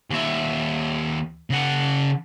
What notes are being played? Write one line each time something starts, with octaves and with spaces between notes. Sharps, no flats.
D#2 E5
C#3 F#5